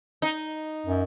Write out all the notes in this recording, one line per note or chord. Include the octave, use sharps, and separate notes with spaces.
D#4
F#2